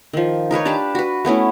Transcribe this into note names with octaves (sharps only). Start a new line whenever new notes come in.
D#3 F3
D#4 A#4 B4 C#5
D4 G4 F5 A5
F#4 B4
A3 B3 C#4 E4